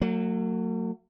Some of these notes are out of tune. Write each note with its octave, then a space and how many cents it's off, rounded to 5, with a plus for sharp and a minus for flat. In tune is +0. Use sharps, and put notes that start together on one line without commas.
F#3 +0 A#3 -45